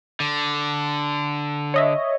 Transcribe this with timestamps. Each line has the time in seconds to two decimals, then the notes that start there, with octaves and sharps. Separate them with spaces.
0.20 D3
1.74 C#5 D#5 E5